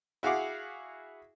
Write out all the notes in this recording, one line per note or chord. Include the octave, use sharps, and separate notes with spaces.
E4 F#4 G#4 F5 F#5 D6